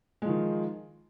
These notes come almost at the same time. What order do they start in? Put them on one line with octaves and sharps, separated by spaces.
G#3 F3 D#3